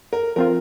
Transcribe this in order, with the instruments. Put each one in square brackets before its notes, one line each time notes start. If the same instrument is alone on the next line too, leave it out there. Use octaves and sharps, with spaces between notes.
[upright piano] A#4
[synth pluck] F3 C4 F4 [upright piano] A#4